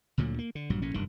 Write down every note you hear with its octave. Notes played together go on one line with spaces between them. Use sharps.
D2 A#2 D3 F#3
A#3
D3
A#1 G2 F#3
A#1 A2 C#4
F1 G2 D#3